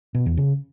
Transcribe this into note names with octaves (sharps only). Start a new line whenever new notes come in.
B2
E2
C#3